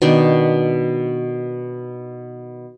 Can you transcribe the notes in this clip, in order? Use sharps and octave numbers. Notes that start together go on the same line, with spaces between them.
B2 D#3 D4